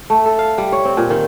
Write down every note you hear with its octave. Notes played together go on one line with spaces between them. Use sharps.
A3
A4
F5
G3
C#5
C4
A#2
D#3